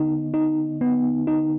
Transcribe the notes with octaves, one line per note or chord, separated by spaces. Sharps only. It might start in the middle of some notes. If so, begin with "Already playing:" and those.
Already playing: D3 B3 D#4
D#4
B3
D#4